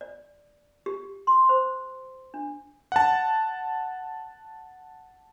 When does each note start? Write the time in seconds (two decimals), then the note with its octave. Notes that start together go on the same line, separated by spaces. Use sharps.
0.01 D5
0.86 G4
1.27 C6
1.49 C5
2.34 D4
2.92 F#5 A5